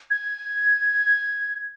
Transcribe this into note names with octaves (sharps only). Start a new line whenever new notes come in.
G#6